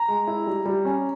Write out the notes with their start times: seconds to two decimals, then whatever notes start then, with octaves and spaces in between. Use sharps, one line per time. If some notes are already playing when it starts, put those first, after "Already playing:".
Already playing: A#5
0.08 G#3
0.27 E4
0.47 G3
0.65 G3
0.85 C#4